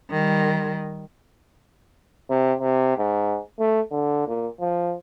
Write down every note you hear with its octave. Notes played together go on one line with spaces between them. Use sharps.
D#3 G3
C3
C3
G#2
A3
D3
A#2
F3